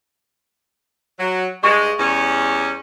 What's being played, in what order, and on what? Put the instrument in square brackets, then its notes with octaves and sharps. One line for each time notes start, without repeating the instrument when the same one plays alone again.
[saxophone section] F#3
[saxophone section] G2 G#3 [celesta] C#6
[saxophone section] E2 G3 C#4